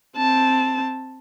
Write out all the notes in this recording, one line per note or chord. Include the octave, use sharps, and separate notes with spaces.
C4 A5